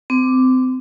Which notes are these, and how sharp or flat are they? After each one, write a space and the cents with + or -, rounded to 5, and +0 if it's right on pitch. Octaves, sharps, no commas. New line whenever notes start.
C4 -25 D6 +0